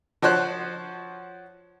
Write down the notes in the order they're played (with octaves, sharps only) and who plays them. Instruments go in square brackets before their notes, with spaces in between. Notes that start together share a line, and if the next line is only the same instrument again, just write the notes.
[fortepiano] F3 F#4 C5 C#5 F#6